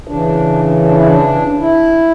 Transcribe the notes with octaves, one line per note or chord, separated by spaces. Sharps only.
C#3 E3 D4
D4
E4
D4
E4